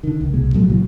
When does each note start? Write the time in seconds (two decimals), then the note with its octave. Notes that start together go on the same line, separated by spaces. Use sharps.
0.03 D3 D#3
0.21 C#2
0.33 C2 B2 G#3
0.54 A#2 F3 F#3 A3
0.69 C#2 A#2 E3 F#3